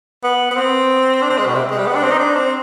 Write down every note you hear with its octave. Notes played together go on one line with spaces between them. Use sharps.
B3
B3
C4
D4
C4
G#3
B2
C3
G#3
G3
B3
D4
C4
D#4
D4
C4